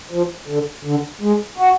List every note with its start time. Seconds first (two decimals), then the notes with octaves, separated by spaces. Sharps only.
0.12 F3
0.48 D3
0.85 D3
1.21 G#3
1.58 F#4